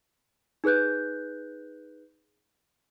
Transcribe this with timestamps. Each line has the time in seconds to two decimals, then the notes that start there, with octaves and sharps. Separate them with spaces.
0.64 D#4 G#4 B4 F#6 G6